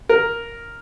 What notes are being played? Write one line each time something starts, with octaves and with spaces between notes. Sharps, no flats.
A#4